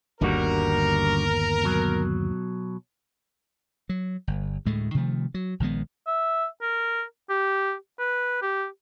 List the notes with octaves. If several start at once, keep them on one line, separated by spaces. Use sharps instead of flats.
G1 D#2 D3 G3 F#4 A#4
B2 F#3
F#3
G1
D2 A2 G#3 A3
C3 D#3 F3 A3
F#3
A#1 D#3 G#3 B3
E5
A#4
G4
B4
G4